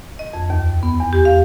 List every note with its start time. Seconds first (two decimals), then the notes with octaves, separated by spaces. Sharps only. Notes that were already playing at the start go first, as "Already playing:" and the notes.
0.19 D#5
0.33 F2
0.50 D#2
0.83 B3
1.00 E2
1.13 G4
1.25 F5